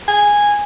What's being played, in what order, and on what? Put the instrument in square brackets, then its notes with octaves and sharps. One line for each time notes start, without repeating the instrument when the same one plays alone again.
[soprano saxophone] G#5